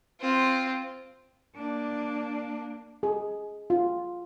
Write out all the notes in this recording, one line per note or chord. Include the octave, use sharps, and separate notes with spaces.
C4 F4
A#3 D4
G#4
F4